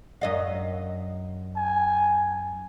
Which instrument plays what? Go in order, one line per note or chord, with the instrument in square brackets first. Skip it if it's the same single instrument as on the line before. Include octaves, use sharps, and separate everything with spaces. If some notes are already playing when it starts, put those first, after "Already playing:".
[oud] F#2 D#5 F5
[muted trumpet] G#5